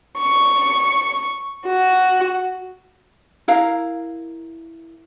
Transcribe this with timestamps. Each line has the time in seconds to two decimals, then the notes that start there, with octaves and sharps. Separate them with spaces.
0.17 C#6
1.65 F#4
3.48 E4 A#4 F5 A#5